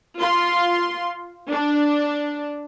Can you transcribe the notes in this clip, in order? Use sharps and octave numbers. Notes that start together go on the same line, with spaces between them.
F4 C6
D4